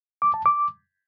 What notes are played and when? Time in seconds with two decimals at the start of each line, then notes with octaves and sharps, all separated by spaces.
0.22 D6
0.34 A5
0.46 D6